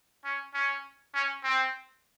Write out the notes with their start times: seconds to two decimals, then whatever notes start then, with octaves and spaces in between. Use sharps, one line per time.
0.25 C#4
0.54 C#4
1.14 C#4
1.44 C4